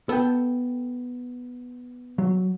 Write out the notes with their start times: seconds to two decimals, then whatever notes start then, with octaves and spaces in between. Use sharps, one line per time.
0.09 B3 A4 G5
2.18 F#3